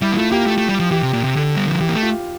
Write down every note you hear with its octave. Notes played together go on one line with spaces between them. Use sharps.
G3 E4
A#3
A3 F4
A#3 G4
A3
A3
G3
F3
E3 G4
C3
A#2
C3
D3 A4
G3
F3
E3 G4
A#3
A3
F4